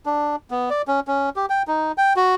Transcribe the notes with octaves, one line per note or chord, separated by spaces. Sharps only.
D4
B3
D5
C#4
C#4
G4
G5
D#4
G5
F#4